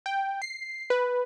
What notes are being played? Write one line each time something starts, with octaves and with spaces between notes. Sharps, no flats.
G5
C7
B4